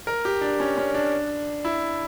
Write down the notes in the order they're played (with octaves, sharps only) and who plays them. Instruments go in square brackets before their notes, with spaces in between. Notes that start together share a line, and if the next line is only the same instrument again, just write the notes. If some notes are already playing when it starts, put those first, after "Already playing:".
[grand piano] A#4
G4
D4
C#4
C#4
D4
E4